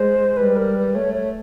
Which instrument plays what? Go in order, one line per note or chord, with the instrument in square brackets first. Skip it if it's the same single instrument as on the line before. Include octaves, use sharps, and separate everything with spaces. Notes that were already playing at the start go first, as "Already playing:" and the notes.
Already playing: [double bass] G#3 [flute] C5
[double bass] G3 [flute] B4
[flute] A#4
B4
[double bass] A3 [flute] C#5
[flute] C#5